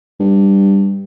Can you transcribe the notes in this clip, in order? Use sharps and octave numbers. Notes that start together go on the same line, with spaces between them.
G2